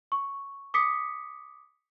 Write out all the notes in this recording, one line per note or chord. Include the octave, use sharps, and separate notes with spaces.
C#6
D6 D#6 B6 C#7